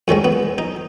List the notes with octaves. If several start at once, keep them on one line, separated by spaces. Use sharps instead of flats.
F2 D#3 G#3 C#4
B3
D#4